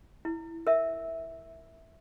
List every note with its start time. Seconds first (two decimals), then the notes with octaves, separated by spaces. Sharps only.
0.25 E4
0.67 A#4 E5